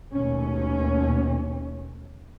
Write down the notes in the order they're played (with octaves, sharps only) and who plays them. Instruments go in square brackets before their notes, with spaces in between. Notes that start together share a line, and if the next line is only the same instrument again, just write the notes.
[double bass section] D#2 B2 A3 C#4